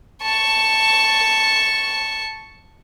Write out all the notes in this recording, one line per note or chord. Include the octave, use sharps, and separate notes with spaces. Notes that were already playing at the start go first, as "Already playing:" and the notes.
A5 C#6